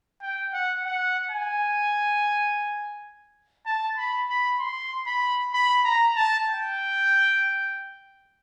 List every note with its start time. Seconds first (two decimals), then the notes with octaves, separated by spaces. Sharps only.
0.22 G5
0.53 F#5
0.85 F#5
1.31 G#5
3.66 A5
3.97 B5
4.29 B5
4.59 C6
5.06 B5
5.53 B5
5.85 A#5
6.16 A5
6.48 G5